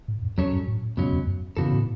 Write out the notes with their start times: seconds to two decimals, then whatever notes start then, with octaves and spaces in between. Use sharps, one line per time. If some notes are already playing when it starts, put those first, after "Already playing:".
0.08 A2
0.23 F#2
0.38 E2 F#3 C#4 A4 C#5
0.53 F#2
0.68 A2
0.97 C#2 F#2 B2 F#3 C#4
1.13 E2
1.27 F#2
1.57 F#2 C#3 E3 B3 F#4 A4
1.72 A2